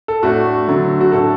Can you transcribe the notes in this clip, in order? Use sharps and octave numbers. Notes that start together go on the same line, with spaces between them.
A4
A2 A3 D4 F#4
D3 F#3 A3
F#4
A2 A3 D4 A4